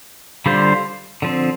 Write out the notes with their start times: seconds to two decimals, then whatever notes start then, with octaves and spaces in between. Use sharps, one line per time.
0.46 D3 G3 F4 C5
1.22 D3 F3 C4